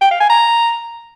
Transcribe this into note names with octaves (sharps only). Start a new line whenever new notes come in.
G5
F5
G#5
A#5